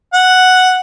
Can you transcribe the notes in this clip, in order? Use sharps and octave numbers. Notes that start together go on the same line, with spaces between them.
F#5